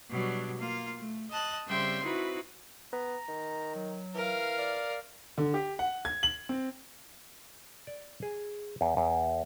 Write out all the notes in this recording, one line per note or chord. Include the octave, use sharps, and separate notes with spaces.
B2 F#3 G3 D4
A#3 F4
A3
D#5 A5 F#6
C#3 G3 C4 E5 G5 C6
C4 D#4 E4 F#4 B4
B3 A#5
D#3
F#3
E3 A#4 F5
D5
D3
G4
F#5
G#6
F#7
C4
D5
G#4
E2
E2